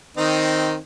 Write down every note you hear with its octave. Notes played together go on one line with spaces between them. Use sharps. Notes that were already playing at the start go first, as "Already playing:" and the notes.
D#3 C4 D#4